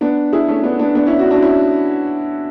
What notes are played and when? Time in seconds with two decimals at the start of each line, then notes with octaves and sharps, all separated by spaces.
0.01 B3 D4
0.33 E4 G#4
0.48 A3 C#4
0.63 B3 D4
0.79 B3 D4
0.95 B3 D4
1.07 C#4 E4
1.19 D4 F#4
1.30 D4 F#4
1.42 C#4 E4